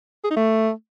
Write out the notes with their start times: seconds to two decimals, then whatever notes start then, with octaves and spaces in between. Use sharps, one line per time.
0.24 G#4
0.30 D#4
0.36 A3